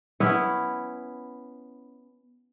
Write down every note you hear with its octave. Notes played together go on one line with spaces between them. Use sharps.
B3 C#4 E4